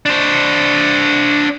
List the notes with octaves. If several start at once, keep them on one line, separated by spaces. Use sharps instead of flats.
D4 C5